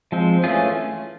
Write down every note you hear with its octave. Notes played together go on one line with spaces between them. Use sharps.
F3 G#3 C4
E3 A3 C#4 F4 G#4